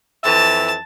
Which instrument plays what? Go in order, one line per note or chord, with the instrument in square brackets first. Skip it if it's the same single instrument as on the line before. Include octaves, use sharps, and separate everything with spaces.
[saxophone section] F2 E3 E5 [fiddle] A5